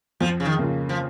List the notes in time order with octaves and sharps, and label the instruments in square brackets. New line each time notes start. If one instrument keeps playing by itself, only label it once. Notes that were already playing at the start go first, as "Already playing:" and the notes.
[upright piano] F2 [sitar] F3
[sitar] C#3
D#3
[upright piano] C#3 A#3 F4
[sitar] F3